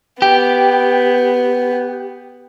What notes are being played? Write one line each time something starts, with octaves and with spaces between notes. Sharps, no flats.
B3 G4